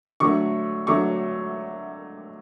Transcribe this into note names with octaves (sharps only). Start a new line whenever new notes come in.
D3 F#3 A3 C#6
D3 F#3 A3 C#6